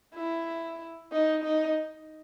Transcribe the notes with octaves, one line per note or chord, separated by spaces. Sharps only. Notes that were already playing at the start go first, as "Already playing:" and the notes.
E4
D#4
D#4